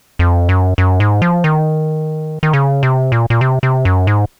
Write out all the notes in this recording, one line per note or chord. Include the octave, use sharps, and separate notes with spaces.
F2
F#2
F#2
G#2
F3
D#3
D#3
C#3
C3
A#2
A#2
C3
C3
F#2
G#2